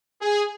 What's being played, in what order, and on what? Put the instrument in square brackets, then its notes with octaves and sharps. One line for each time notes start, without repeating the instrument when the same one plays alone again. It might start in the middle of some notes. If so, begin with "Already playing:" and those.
[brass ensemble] G#4